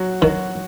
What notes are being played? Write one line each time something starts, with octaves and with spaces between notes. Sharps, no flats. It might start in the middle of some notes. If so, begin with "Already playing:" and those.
Already playing: F#3 F#4
D#3 F#3 F#4